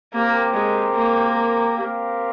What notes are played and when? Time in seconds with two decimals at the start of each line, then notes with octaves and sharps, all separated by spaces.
0.13 A#3 C4 G4 A#4
0.54 G#3
0.95 A#3
1.77 C4 G4 A#4 F5